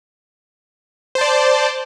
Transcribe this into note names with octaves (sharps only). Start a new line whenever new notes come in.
C5 D5 A5